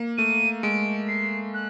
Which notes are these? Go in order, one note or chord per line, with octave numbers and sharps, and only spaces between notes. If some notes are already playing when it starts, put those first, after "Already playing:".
Already playing: A#3
A3 D#7
G#3 D7
C7
F#6